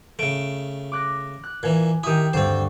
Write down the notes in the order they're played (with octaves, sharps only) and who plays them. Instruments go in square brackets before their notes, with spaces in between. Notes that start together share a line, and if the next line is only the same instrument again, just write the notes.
[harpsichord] C#3 A3 [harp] D7
[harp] D6 F#6 A#6
F#6
[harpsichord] A#2 E3 [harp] G#5
[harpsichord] D#3 E4 [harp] G4 D#6
[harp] D2 G2 [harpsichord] C4 C5